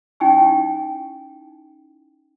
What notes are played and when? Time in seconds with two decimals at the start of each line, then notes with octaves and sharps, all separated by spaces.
0.20 C#4 D#4 E4 G5 G#5 C#6